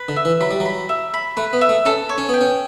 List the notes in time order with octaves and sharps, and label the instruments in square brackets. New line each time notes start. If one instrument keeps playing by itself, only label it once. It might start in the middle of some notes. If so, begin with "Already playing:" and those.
Already playing: [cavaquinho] B4
[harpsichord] D3
[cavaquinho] E5
[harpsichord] E3
[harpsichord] F#3 [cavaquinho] B5
[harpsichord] G3
F#3
[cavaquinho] B5
E5
B5
[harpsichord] A3 [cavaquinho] B4
[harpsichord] B3
[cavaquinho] E5
[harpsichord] A3
[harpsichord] C#4 [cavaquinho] A4
[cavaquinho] C#5
[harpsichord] C#4
[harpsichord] B3 [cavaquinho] G5
[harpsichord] C#4